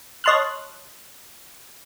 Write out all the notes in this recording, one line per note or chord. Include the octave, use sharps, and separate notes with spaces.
C#5 D#5 A5 C6 F6 F#6